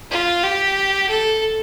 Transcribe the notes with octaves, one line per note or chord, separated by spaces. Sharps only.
F4
G4
A4